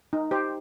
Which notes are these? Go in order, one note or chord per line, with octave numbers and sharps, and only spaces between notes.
D#4
G4 C5